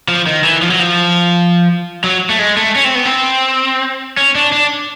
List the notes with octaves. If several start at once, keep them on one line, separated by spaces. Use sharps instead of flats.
F3
D#3
E3
F3
F#3
F3
F#3
A3
G#3
A3
C#4
C4
B3
C4
C#4
D4
D4